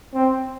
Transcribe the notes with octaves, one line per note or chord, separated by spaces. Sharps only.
C4